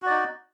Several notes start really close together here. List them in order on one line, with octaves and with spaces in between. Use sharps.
F#4 D5 D#4